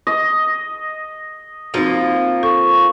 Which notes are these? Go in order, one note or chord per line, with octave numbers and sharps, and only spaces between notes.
D#5
F3 A#3 C4 D#4 F#4
A4 C#6